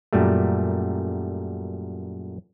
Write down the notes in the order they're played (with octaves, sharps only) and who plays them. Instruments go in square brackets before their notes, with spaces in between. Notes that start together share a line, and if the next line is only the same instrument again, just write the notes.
[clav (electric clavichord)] F#2 A#2 G3 A3